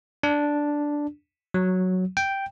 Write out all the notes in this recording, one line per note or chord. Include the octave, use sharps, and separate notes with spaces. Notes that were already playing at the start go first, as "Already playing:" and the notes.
D4
F#3
G5